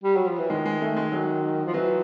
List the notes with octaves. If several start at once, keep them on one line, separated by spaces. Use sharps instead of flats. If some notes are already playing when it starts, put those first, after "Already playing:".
G3
F#3
F3
E3
D#3 G#3
G#3
A3
G#3
F#3
F3
E3 F#3